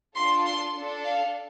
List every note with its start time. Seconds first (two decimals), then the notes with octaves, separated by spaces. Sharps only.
0.16 D4 F4 A4 C6
0.46 C6
0.76 D4 A4
1.05 F5